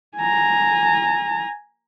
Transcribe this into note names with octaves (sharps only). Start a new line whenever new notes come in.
G#5 A#5